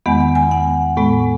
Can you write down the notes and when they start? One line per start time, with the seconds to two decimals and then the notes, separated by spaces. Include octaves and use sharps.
0.06 E2 D#3 G#3 B3 F#5
0.20 F#5
0.35 G#5
0.51 F#5
0.97 A2 G#3 B3